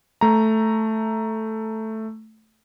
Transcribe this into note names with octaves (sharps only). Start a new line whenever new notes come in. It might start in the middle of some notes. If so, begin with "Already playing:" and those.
A3 A#5